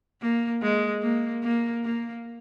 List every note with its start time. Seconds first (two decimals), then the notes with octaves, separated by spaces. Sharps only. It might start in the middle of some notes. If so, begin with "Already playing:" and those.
0.21 A#3
0.62 G#3
1.02 A#3
1.43 A#3
1.84 A#3